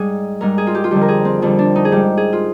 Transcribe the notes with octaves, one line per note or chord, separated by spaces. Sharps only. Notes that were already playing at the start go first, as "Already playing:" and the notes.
Already playing: G#2 G3 G#4
G#2 G3 A#4
G#4
F4
G4
F4
F2 D3 G3 G4
A#4
G#4
C4
F2 D3 G3 C4
D4
D#4
G#4
G#2 G3 G4
G#4
F4